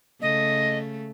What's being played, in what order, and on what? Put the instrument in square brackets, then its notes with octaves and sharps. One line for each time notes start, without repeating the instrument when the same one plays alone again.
[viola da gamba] C#3 A3 [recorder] D#5